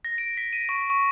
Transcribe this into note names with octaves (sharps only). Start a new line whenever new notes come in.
A#6
D7
B6
D#7
C#6
C#6